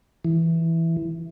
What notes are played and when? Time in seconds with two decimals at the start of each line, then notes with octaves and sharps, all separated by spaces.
0.25 E3